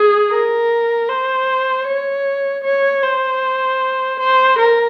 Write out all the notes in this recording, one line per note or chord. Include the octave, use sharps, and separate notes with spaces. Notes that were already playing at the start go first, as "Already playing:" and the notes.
Already playing: G#4
A#4
C5
C#5
C#5
C5
C5
A#4